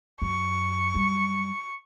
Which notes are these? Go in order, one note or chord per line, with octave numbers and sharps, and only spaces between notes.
F#2 C#6
F#2 G3